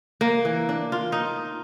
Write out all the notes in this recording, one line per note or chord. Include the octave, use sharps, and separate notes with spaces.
A#3
E3
D4
F4
D#4